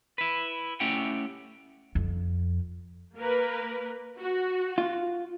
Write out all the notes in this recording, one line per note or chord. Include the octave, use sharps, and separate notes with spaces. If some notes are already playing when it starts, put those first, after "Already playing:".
E4 B4
A3 C#4 E4 G4 F#5 G5
F2
A#3 A#4 B4
F#4
F4